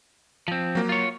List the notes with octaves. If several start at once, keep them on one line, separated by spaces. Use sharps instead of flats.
F3 C4
F#3 A#3
F4 C#5